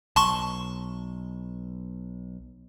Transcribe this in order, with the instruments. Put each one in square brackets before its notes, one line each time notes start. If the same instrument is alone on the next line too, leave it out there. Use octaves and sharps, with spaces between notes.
[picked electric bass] B1 [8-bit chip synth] A5 C6 C#6